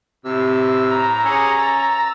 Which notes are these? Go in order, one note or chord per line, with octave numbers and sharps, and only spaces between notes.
A2 C3 E6
A#5
C#4 G4 G#4 F#5
E6 A6